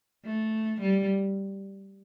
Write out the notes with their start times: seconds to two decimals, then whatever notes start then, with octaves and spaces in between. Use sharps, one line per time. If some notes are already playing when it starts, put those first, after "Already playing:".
0.25 A3
0.81 G3